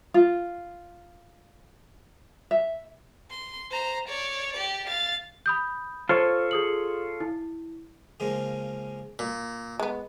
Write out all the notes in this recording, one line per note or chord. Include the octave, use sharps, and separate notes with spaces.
F4
E5
C6
C5 A#5
C#5 D5
G4 D5
F5 A6
B5 D#6 G6
F4 A4 C5 C#5 C#6
G#4 D#6 F#7
E4
C#3 F3 G#3 A#3
A#2
G#3 B3